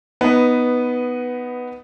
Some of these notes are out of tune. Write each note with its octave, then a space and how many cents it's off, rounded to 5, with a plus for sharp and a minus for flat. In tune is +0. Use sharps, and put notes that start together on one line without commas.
B3 +0 D#4 +5 B4 +10